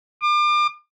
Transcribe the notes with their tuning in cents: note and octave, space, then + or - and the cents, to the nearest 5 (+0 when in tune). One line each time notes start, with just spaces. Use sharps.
D6 +35